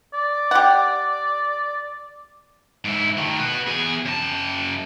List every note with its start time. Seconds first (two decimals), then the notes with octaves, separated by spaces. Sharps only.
0.13 D5
0.51 G4 F#5
2.85 G#2 E4
3.18 D#3 A3
3.39 F#4 B4
3.68 E2 G#4
4.06 F#2 A5